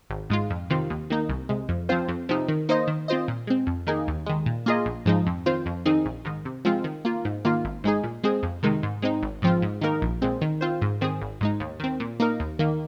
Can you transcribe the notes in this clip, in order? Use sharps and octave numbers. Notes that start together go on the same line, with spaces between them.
G#1
G#2 G#3 F4
F2
C3 D#3 C4 F4
D#2
D#3 A#3 D#4
C2
C3 G#3
F2
F3 C4 F4 C5
F2
C3 F3 C4 D#4
D#3
A#3 D#4 C5 D#5
D#3
C4 F4 C5 D#5
A#2
G#3 C4
F2
D#3 A#3 D#4 G#4
D#2
D#3 G#3
A#2
A#3 F4 G#4 D#5
A#1
G#2 F3 G#3 D#4
F2
D#3 C4 F4 C5
F2
D#3 C4 D#4 G#4
A#1
G#2 D#3
C3
F3 G#3 C4 F4
D#3
A#3 F4
G#2
D#3 A#3 F4
G#1
G#2 G#3 D#4 G#4
A#2
G#3 C4 G#4
F2
C3 D#3 G#3 D#4
G#2
G#3 C4 D#4
G#1
G#2 F3 C4 F4
G#2
D#3 A#3 D#4 A#4
A#1
A#2 G#3 C4
D#3
C4 F4 C5
G#2
D#3 C4 G#4
G#1
G#2 G#3 D#4
D#2
D#3 C4
A#2
A#3 D#4 A#4
D#2
D#3 A#3